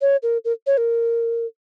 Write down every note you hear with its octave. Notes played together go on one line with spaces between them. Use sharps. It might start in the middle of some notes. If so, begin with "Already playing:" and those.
C#5
A#4
A#4
C#5
A#4